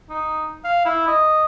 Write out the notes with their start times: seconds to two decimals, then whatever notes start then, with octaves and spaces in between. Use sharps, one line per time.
0.10 D#4
0.64 F5
0.85 E4
1.07 D#5